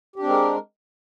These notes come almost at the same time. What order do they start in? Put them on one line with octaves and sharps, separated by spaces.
G4 D4 C4 G#3 A#4